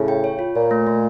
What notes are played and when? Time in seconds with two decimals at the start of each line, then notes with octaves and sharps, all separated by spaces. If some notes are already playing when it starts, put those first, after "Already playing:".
Already playing: A2 C#3
0.08 G5
0.24 C#5
0.39 F4
0.55 A#2 C#5
0.71 A3
0.87 A3